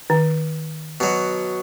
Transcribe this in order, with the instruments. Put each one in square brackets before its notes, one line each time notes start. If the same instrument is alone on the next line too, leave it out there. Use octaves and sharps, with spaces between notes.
[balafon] D#3
[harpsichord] B2 F#3